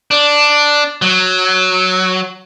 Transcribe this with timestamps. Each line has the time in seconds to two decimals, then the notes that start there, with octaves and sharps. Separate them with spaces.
0.11 D4
1.02 F#3